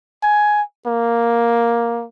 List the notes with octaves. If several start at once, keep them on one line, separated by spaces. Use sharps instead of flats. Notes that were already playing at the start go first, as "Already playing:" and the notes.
G#5
A#3